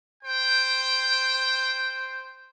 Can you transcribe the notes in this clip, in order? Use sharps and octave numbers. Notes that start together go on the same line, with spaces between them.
C5 G5